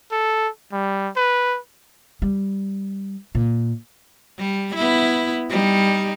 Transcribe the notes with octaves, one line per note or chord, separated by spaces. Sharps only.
A4
G3
B4
G3
A#2
G3
B3 E4
G3 D#4